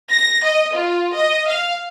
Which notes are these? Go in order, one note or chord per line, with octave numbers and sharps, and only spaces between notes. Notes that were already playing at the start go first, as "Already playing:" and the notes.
A#6
D#5
F4
D#5
F5